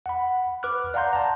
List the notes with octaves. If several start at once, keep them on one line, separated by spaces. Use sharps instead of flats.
F#5 B5
B4 D6 F6 F#6
D5 F5 F#5 A#5 C6 G6
A5 A#5